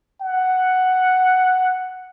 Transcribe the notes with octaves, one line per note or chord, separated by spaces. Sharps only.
F#5